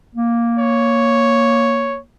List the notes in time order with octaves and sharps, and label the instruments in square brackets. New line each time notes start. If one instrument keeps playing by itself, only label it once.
[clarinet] A#3
[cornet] C#5